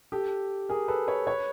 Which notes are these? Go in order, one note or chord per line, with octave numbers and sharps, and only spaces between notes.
G4 A4
G#4 A#4
A4 B4
B4 C#5
B4 C#5